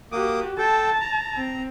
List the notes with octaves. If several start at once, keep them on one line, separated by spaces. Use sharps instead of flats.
A#3 F#4 G4 D6 D#6
A4 G5 A5
A#5
C4